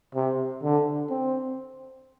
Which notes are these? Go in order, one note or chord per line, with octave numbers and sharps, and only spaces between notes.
C3
D3
C4